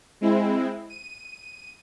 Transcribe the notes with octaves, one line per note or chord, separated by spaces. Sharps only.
G#3 C4 E4
D#7